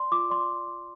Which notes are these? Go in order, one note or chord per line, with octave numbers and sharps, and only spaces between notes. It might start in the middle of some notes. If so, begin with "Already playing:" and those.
Already playing: D5 C6
F4 D6
D5 C6